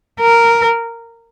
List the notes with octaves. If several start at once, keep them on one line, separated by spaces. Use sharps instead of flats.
A#4